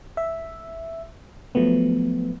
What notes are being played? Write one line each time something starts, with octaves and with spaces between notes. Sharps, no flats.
E5
F3 F#3 A3 B3